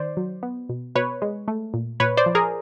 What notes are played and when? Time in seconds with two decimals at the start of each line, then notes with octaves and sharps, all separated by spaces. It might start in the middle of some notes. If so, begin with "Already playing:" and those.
Already playing: D#3 C5 D5
0.17 F#3
0.43 B3
0.69 B2
0.95 B2 B4 C#5
1.22 G#3
1.48 A3
1.74 A#2
2.00 A#2 B4 C#5
2.17 C5 D5
2.26 F3
2.35 G#4 A#4